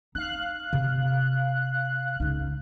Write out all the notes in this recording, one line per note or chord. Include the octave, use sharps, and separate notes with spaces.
D#4 F5 F#6
C3
C#2 D#4